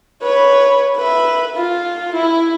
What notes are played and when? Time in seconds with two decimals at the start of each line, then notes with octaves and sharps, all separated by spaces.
0.22 B4 C#5
0.96 B4 E5
1.57 F4
2.15 E4